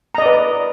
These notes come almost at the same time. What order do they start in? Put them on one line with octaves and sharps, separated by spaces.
A#5 D#5 D5 B4